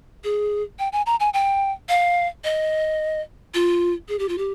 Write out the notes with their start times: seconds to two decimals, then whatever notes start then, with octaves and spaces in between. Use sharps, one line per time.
0.24 G#4
0.79 G5
0.93 G#5
1.06 A#5
1.20 G#5
1.34 G5
1.89 F5
2.44 D#5
3.54 F4
4.09 G#4
4.19 G4
4.29 F4
4.38 G4